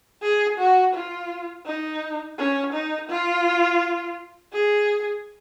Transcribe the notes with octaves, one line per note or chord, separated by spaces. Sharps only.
G#4
F#4
F4
D#4
C#4
D#4
F4
G#4